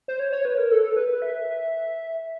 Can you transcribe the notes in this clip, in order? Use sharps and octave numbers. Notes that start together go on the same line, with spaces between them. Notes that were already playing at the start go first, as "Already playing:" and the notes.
C5
C#5
C#5
B4
A#4
A4
B4
E5